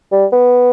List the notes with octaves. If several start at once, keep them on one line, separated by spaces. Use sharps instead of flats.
G3
B3